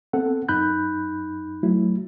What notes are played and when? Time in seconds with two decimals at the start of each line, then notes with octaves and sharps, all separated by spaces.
0.13 B3 C4 A4 F#5
0.49 F#2 D#4 B5 F#6 G6
1.63 F#3 A3 E4 F#4